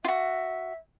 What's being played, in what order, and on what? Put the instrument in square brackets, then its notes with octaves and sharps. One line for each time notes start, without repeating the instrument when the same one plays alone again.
[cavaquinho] F4 F#4 [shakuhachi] E5